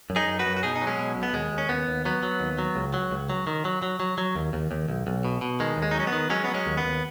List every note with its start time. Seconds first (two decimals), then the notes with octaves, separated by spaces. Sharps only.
0.10 F#2
0.16 D#4 G#4
0.27 F#2
0.39 F#4 B4
0.46 F#2
0.57 F#4
0.63 B2 D#4 G#4
0.76 D#4
0.82 F#3
0.87 G#3 C#4
0.99 B2
1.16 B1
1.23 B3
1.34 D#2 G#3
1.52 D#2
1.58 C#4
1.69 D#2 B3
1.88 D#2
2.05 F#3 B3
2.23 F#3
2.40 D#2
2.59 F#3
2.76 C#2
2.94 F#3
3.11 C#2
3.30 F#3
3.47 D#3
3.65 F#3
3.83 F#3
4.00 F#3
4.18 F#3
4.36 D#2
4.53 D#2
4.71 D#2
4.88 B1
5.07 B1
5.25 B2
5.41 B2
5.60 D#3 G#3
5.77 D#2
5.82 G#3
5.91 D#4
5.95 F#3 C#4
6.07 B3
6.12 D#3
6.30 F#3 G#3 C#4
6.44 F#3 B3
6.54 G#3 C#4
6.66 D#2
6.77 B3
6.84 D#2